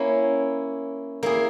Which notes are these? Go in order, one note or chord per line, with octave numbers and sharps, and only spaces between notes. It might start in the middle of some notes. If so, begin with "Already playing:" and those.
Already playing: A#3 C#4 E4
A#3 E4 G#4